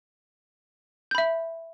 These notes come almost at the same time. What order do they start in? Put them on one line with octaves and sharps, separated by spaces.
G6 B5 E5